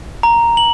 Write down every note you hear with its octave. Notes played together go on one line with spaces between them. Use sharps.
A#5
F#7